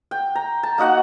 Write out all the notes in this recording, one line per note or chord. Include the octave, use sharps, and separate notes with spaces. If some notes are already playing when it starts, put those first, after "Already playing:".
G5
A#5
A5
A#3 D#4 F#4 F#5